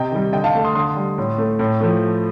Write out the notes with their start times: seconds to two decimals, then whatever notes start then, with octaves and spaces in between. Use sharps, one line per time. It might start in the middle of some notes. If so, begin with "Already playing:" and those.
Already playing: C3 D#5 G5
0.12 D#3 G3
0.32 D3 D#5 G5
0.44 F5 A5
0.55 A3
0.64 C6 D#6
0.75 D3 C6 D#6
0.96 G3
1.18 A2
1.38 A3
1.59 A2
1.81 F3 A3